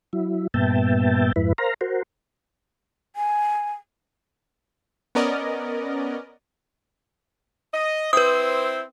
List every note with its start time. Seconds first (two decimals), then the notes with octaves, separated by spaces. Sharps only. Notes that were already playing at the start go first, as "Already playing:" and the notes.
0.13 F#3 E4
0.54 G2 A#2 B3 E5 G5 A5
1.36 F2 G#2 E4 B4
1.58 A#4 C5 F5 A#5
1.81 F#4 A#4 C5
3.16 G#5
5.15 B3 C#4 A#4 D5 D#5
7.74 D#5
8.13 C4 E4 B4 C5 D#6